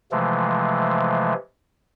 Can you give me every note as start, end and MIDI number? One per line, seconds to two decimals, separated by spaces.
0.12 1.34 48
0.12 1.34 52
0.12 1.34 53
0.12 1.34 56
0.12 1.34 57